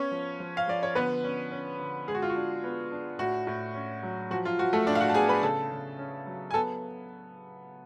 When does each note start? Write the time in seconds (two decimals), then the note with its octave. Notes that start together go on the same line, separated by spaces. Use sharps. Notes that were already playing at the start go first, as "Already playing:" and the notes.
Already playing: B3 C#4 C#5
0.11 F3
0.40 F3
0.57 F5
0.68 F3 D5
0.83 C#5
0.95 D3 B3 B4
1.24 C#4
1.51 C#4
1.79 D3
2.07 G#3 G#4
2.15 F#4
2.22 F4
2.30 F#4
2.35 D4
2.64 B3
2.92 D4
3.19 A2 F#4
3.47 A2
3.75 C#4
4.03 F#3
4.30 F3 F#4
4.45 F4
4.59 F3 F#4
4.73 A3 A4
4.87 A2 D4 D5
4.95 F5
5.00 F#4 F#5
5.09 A5
5.14 B3 G#4 G#5
5.29 B4 B5
5.43 C#3 A4 A5
5.71 C#3
5.98 C#4
6.27 F#3
6.51 G#5
6.54 B3 A4 A5